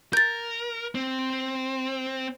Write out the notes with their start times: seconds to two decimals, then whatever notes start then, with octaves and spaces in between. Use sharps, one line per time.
0.13 A#4 G6 A6
0.95 C4